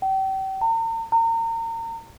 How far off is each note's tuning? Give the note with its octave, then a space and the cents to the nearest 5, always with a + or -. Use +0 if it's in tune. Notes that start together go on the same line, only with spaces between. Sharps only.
G5 -35
A#5 -45
A#5 -35